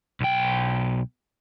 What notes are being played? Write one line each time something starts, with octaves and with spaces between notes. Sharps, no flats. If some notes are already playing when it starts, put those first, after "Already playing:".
B1 G5